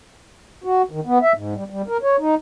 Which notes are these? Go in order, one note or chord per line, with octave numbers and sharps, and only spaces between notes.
F#4
D#3
B3
E5
G#2
G3
G3
A#4
C#5
D#4